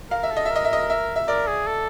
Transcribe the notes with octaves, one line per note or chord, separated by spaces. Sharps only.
A#4 F5
E5
A4
D#5
E5
A#4
D#5
E5
D#5
E5
E5
A#4 D5
G#4
A4